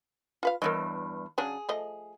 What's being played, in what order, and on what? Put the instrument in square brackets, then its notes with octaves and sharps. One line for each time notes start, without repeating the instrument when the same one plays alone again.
[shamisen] F4 B4 F5
[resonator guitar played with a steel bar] E2 G2 [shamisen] A#4 C#5 D#5
[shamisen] C#3 F#3 D4 [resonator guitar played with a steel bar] G#4
[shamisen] F3 A3 D#5